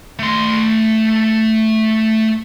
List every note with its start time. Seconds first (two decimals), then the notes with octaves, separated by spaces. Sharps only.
0.19 A3 C6